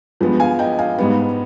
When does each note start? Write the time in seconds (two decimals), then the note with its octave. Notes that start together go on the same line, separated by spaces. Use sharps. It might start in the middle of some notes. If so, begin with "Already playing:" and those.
0.21 G2 F3 G#3 B3
0.40 F5 G#5
0.59 D#5 G5
0.79 F5 G#5
0.98 G#2 G3 B3